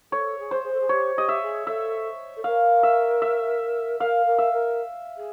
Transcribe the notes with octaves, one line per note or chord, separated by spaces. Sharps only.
A4 C#5
G#4
C5
G#4
A4
G#4
G4 C#5
G4 D#5
E5
G#4
A4 E5
A4
A#4 F5
E5
E5
A#4 F5
A#4
E5
A#4
G#4